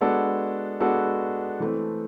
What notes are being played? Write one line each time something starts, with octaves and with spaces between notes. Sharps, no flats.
G#3 B3 D4 F#4 A4
G#3 B3 D4 F#4 A4
E3 A3 C4